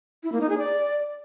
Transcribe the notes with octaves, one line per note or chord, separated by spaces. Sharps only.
E4
A#3
D#4
G#4
D5